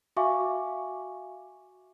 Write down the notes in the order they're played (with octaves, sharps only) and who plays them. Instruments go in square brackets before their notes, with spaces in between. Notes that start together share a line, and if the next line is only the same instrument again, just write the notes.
[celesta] F#4 E5 F5 G#5 C#6 D6